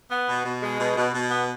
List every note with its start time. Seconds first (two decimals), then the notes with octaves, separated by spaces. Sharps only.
0.11 B3
0.28 B2
0.45 B2
0.62 G#3
0.80 B2
0.96 B2
1.13 B2
1.31 B3